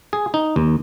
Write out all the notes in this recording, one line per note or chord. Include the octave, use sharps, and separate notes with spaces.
G#4
D#4
D#2